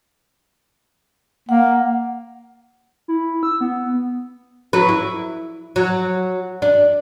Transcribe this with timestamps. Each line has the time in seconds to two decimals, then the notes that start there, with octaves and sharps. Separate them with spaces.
1.49 A#3 F#5
3.08 E4
3.43 E6
3.61 B3
4.73 F#3 B4
4.89 E4
5.76 F#3
6.62 D4